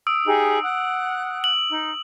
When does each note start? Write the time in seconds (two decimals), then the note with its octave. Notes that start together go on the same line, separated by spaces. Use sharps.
0.07 D#6 E6 D7
0.26 D#4 G4 G#4
0.62 F#5 F#6
1.44 F#7
1.71 D#4